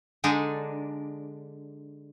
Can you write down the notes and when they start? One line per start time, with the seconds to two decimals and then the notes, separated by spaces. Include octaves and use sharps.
0.24 D3 G#3 D4 D#4